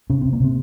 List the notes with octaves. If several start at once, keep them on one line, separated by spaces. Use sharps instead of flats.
C3 C#4
C3 C4
A#3
C3 C4